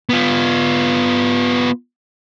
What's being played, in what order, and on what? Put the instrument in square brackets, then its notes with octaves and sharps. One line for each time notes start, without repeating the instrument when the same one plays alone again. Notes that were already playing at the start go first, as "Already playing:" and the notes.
[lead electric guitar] B3 F4